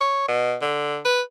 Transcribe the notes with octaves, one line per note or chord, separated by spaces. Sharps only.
C#5
B2
D3
B4